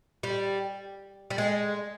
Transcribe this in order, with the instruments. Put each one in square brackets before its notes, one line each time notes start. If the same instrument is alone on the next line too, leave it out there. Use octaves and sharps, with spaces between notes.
[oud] G3
G3
G#3